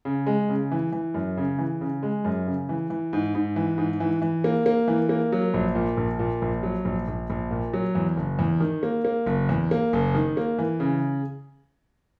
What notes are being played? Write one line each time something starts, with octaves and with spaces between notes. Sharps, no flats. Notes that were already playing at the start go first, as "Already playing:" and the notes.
C#3
G#3
C#3
E3
E3
F#2
C#3
E3
C#3
G#3
F#2
C#3
E3
E3
G#2
G#2
E3
G#2
E3
E3
A#3
A#3
E3
A#3
F#3
A#1
A#2
A#1
A#2
A#1
F#3
A#1
A#1
A#1
A#2
F#3
E2
F#1
E2
D#3
A#3
A#3
F#1
E2
A#3
F#1
D#3
A#3
E3
C#3